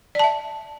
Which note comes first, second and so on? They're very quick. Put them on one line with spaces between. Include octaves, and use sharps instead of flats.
D5 A5 E5